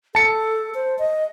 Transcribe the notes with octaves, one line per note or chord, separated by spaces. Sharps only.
A4 A5 C#7
C5
D#5